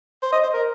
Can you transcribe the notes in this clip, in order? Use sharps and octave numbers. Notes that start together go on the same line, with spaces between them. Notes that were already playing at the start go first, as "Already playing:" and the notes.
C5
D#5
C5
A#4